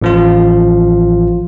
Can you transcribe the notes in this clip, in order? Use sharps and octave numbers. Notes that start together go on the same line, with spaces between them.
A1 F3 F4